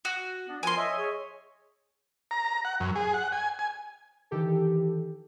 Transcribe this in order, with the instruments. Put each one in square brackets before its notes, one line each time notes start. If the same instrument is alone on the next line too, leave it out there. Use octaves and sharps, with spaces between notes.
[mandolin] F#4
[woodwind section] B3 D4
[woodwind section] F3 F4 A#4 [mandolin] G#5 C6
[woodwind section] C#5 D#5 E5
G#4 C#5
[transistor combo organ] A#5
F#5
F#2
G#4
F#5
G#5
G#5
[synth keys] D#3 E3 G4 A4